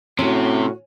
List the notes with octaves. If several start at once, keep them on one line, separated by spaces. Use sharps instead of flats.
A2 C3 C#4 F#4